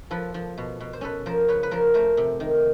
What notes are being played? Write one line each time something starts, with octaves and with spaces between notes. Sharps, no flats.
F3 A4 B4
F3
B2
B2
C5
C#4 A4 B4
F3 A#4 C5
C#3 B4 C#5
B4
F3 A#4 C5
A3 A#4 C5
C3
D#3